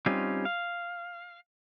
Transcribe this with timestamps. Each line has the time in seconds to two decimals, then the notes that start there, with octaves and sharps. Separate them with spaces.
0.06 G3 C4 C#4 D#4 F4
0.45 F5